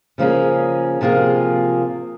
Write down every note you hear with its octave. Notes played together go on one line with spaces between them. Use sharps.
C#3 F3 A#3 C#4 G#4
C3 F3 A#3 F4 G#4